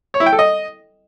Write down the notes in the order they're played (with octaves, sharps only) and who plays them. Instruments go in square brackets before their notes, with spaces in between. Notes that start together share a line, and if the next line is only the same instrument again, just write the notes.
[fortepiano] C#5
E4
G5
A4
D#5